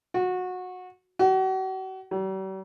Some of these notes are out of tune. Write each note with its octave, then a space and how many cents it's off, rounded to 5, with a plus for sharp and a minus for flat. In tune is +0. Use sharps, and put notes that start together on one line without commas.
F#4 -20
F#4 +40
G3 -45